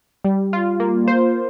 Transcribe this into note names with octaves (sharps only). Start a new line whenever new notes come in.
G3
F4
A#3
C5